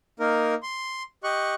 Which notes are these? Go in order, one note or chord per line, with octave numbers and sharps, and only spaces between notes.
A#3 D#4 A#4
C6
G4 D#5 C#6 F#6